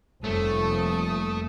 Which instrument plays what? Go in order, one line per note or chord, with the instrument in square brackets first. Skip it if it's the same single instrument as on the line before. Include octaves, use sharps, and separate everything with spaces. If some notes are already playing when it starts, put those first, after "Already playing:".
[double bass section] F1 [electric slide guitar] G3 A#3 C#5 [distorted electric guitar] A3 [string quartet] A4 D#6